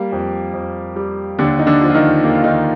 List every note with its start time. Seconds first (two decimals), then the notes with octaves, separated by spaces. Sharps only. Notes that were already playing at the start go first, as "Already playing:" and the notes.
Already playing: G3 A#3
0.12 F2
0.53 F2
0.96 G3
1.39 D#2 D3 D4
1.59 D#4
1.67 D3 D4
1.81 F3
1.90 F4
1.95 D#3 D#4
2.24 D#2 A#3
2.34 F4
2.44 D#3 D#4